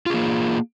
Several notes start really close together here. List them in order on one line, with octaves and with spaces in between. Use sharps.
F4 G#4 A#3